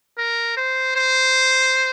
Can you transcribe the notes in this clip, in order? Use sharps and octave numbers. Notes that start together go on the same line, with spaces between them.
A#4
C5
C5